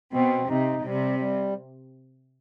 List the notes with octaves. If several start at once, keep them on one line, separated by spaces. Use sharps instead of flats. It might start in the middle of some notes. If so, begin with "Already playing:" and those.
B2 C4
C3 D#4
C3 G3
G3